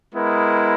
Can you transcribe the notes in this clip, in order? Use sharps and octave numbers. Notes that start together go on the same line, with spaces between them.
G#3 B3 E4 A#4